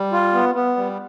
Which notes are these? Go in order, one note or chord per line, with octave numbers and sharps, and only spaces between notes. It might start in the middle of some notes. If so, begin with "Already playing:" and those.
Already playing: G3
F4
B3
B3
G3